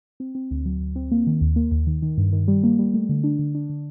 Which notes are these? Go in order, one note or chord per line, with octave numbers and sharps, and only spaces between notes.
C4
C4
D2
F#3
D2
C4
A#3
D#3
D#2
A#3
D#2
D#3
D#3
G2
D#3
G3
A#3
G3
A3
D3
D4
D3
D4
D3